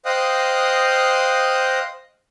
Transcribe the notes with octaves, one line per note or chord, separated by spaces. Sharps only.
C5 D#5 F5 G5 D#6 F#6